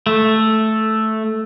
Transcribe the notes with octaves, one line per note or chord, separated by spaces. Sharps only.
A3